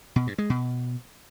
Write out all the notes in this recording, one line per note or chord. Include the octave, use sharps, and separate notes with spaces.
B2
G2
G#3
B2